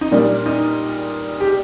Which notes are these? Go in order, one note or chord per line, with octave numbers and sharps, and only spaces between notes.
D#4
A#2 G3 A#3 D4
D#4
G4